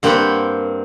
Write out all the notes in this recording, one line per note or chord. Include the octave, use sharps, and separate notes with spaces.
G2 A#3 C4 F#5 G5 B5